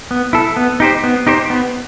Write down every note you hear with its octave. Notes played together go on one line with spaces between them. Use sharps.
B3
E4 A4
B3
D#4 G4 C5
B3
D#4 G4 C5
B3